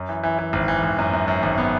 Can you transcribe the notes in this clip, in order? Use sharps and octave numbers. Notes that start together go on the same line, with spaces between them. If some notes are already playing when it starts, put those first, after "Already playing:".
Already playing: F#2
E3
E3
E3
G#1
E3
G#1
F#2
F#2
F#2
G#1
B3